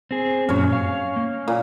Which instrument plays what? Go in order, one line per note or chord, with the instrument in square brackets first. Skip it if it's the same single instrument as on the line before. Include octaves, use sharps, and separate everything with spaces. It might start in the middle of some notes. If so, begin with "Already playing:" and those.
[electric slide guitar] C4 G#4
[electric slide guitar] F#2 A#2 F#3 [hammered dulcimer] C#4 C#5
[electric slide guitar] F5
A#3
[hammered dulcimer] A#2